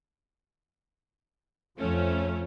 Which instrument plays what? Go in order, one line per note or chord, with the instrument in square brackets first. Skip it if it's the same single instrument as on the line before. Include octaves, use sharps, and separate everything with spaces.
[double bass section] F2 F3 [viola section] A3 C#4